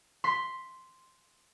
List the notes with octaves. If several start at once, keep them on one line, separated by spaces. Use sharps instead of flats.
C6 B6